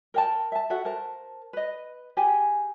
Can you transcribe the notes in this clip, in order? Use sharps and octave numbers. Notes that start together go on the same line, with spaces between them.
A#4 G5 A5
E5 A5
F#4 A4 E5 F#5
A#4 C5 A5
B4 D#5
G4 G#4 G5 G#5